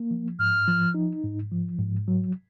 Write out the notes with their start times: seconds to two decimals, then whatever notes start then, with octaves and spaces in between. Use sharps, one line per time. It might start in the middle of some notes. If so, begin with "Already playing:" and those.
Already playing: A#3
0.11 F3
0.39 G#2 F6
0.68 F3
0.94 D#4
1.24 G#2
1.51 F3
1.79 G#2
2.08 F#3